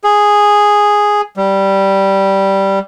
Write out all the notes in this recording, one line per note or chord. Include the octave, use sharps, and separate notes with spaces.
G#4
G3